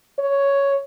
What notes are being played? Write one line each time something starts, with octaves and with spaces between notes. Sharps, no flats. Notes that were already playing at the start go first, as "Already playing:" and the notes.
C#5